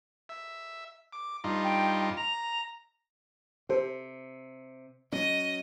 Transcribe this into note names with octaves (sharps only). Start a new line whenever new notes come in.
E5
D6
G2 D#4 F4
G5
A#5 F7
C3 G4 A4 C5
F#3 C#4 D#5